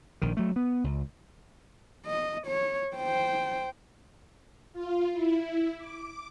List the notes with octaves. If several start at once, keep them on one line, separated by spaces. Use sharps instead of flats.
A#1 D#3
F#3 A3
B3
C#2
D#5
C#5
C5 G5
F4
E4
D6